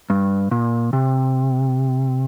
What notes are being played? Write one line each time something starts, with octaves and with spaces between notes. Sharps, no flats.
G2
A#2
C3